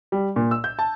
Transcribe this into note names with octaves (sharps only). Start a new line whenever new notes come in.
G3
A#2
E6
G6
A5